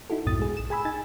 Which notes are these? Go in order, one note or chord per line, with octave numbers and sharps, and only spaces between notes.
D#4 E4 F#4 A4
B1 F2 G#2 B2 D#6 A6
G#3 G#4
A#1 E7
G#4 G#5 B5 E6
D#4 G#5 A6